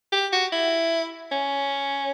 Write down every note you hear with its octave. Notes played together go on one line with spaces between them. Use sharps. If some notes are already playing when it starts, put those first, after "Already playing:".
G4
F#4
E4
C#4